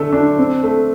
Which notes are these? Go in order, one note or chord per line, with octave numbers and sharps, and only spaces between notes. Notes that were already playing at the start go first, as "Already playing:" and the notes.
Already playing: D3 A3 A4
D4
C4
A3